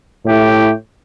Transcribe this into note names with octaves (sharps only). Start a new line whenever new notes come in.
A2 A3 E4 G4